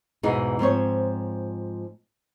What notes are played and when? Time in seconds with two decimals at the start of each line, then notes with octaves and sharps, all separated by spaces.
0.23 E2 G#2 B2 E3 D#4 G#4
0.59 G#2 F3 C4 C#5